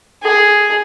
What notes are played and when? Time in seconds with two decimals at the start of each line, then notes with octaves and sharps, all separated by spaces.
0.23 G#4